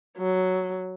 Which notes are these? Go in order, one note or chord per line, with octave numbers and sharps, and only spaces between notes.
F#3